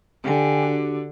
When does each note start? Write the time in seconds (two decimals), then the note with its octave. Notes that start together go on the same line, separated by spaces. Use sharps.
0.24 D3 G4 G5 G#5
0.63 D4 F#4 G4